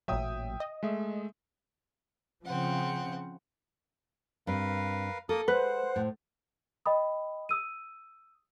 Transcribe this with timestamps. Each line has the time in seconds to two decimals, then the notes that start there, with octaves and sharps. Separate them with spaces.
0.08 A1 A#2 F#3 E5 G5 D#6
0.60 D#5
0.83 G#3 A3 E5
2.44 C#3 F3 C4 F#5
4.47 G2 C4 A#4 B4 F5
5.29 A#3 A4 A#4 D#6
5.48 G#3 B4 C5 F#5
5.96 A2
6.86 D#5 G5 B5 D#6
7.49 D#6 E6 D#7